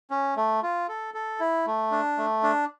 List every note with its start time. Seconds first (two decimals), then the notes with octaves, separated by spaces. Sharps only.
0.11 C#4
0.37 A3
0.63 F4
0.88 A4
1.14 A4
1.40 E4
1.67 A3
1.92 D4
2.17 A3
2.43 D4